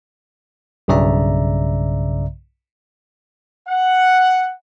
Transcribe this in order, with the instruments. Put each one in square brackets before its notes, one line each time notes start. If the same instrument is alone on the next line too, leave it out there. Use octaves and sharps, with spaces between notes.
[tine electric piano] B1 G2 C#3 D5 E5 A#5
[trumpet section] F#5